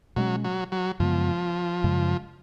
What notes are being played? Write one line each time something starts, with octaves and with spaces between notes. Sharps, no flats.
B2 F#3 G#3 C#4
F#3
F#3
F#2 C#3 F3 G#3 B3
F#2 C#3 G#3